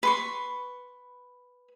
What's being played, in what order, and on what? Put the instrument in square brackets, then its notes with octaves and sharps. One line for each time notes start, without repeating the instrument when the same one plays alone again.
[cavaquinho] B4 C6 C#6